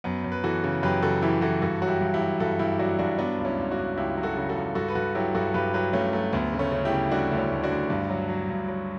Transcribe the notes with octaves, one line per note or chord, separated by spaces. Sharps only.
F#2 B3
F#2
B4
E3 F#4 A4
C#3
F#2 G4 B4
C#3 F#4 A4
E3 E4 G4
E3 F#4 A4
G2 F#4 A4
F#3 F#4
E4 G4
G2
E4 G4
F#3
G2 F#4 A4
G2 E4 G4
F#3 D4 F#4
G2 D4 F#4
F#3 B3 D4
C#2
C#4 E4
C#2
D4 F#4
C#2
C#2 E4 G4
F#3
F#4 A4
C#3
F#4 A4
C#2
G2 F#4 A4
B4
G2 F#4 A4
F#3 E4 G4
G2 F#4 A4
G2 G4 B4
F#3 G4 B4
G2 A3 C#4
F#3 A3
D2 B3
C#3
A3 C#4
C#3
E4 G4
C#3
G3 D4 F#4
D2
C#4 E4
D2
D4 F#4
D2
G2
F#3
F#3
G2
F#3